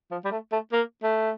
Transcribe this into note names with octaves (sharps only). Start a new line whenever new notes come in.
F3
G3
A3
A3
A#3
A3